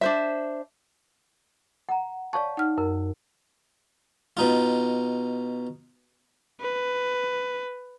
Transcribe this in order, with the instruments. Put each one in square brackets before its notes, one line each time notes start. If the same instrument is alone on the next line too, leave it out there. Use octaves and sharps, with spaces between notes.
[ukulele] D4 C5 E5
[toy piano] F#5 A#5
[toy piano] C#5 F5 A5 [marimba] D5 C#6
[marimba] D#4 F6 [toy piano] F#5
[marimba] F#2 [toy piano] A#4
[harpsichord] B2 D#4 F4
[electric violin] B4